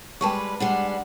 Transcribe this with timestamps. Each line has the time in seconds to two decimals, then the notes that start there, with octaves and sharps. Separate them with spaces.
0.21 G3 G#3 B4 G5 A5 C#6
0.60 G3 G#3 D4 F#5